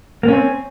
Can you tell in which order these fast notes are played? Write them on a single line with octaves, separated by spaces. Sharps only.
A#3 C#4 C4